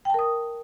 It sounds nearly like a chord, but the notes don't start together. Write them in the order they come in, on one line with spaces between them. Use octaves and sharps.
G5 A5 A#4 D#6